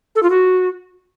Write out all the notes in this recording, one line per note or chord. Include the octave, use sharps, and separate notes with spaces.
A4
F4
F#4